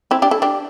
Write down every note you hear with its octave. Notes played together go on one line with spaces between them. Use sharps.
C4 E4
D4 G4
E4 A4
D4 G4